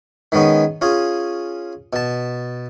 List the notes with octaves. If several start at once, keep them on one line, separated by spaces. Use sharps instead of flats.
D#3 G#3 B3 C#4 D#4
C#4 F4 G#4
B2 A5